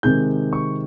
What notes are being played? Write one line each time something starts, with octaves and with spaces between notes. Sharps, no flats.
C3 D#3 G#3 G6
C#6